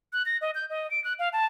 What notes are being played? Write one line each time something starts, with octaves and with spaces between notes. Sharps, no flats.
F#6
A#6
D#5
G6
D#5
D7
F#6
F5
A5